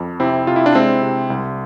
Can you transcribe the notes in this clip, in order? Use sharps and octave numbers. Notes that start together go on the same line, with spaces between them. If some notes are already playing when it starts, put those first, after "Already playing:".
Already playing: F2
C3 C4 E4
C3 F4
E4
D4
G#3 C4 E4
C3
C2